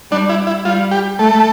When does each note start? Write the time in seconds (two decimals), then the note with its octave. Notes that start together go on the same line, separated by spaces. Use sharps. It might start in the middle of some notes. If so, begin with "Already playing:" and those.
0.11 G3 D4
0.29 E4
0.47 E4
0.65 G3 F4
0.91 G4
1.19 A3 A4